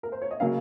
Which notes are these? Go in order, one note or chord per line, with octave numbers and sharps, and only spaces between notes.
A#4
C5
C#5
D#5
C#3 F#3 A#3 F5